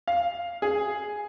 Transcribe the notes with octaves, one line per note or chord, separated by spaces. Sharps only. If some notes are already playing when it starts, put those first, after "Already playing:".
F5
G#4